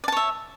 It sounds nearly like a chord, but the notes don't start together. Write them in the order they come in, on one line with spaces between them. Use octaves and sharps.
D5 A5 C#5 E5